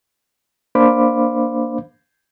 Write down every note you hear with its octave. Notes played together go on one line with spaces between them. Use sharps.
A#3 D4 C5 F5 B5 D6